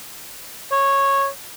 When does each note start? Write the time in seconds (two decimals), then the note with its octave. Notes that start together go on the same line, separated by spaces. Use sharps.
0.72 C#5